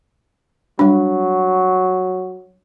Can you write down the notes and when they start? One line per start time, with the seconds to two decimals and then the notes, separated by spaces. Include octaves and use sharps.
0.79 F#3 G3 D4